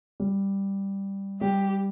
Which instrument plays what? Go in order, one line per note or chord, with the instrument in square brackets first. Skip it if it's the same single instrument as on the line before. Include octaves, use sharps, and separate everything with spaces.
[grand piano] G3
[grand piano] G3 [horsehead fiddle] G4